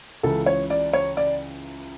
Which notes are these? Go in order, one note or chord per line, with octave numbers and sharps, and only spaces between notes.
C#2 C#3 E3 A4
C#5
D5
C#5
D5